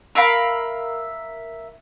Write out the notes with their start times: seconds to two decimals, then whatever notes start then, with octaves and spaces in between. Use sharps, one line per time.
0.15 A#4 E5 F5 B5